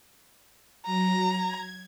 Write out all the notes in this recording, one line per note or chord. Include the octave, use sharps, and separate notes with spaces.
F#3 A#5
G#6